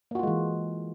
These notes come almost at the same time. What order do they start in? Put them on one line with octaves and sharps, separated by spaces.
A#3 F#4 F4 G#3 E3